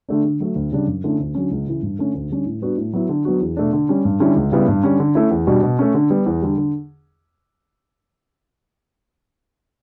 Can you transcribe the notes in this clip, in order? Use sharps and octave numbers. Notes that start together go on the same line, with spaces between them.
D3 A3 D4
D3
F#3 A3
D2
C#3 G3 D4
F#2
D3 A3 C#4 E4
D2
D3 F#3 C#4
C#2
C#3 E3
G2
D3 A3 C#4
D2
D3 G3 C#4
A2
G3 B3 D4 F#4
A2
F#3 B3 E4
D3
F#3 B3 D4 F#4
E2
B2 A3 D4
D3
G3 C#4
G2
D3 G3 C#4 E4
C#2
C#3 G3 B3 E4
G2
D3 G3 C#4
D3
A3 C#4 E4
E2
B2 G3 D4 F#4
B2
A3 C#4
D3
G3 B3
E2
D3 G3
D3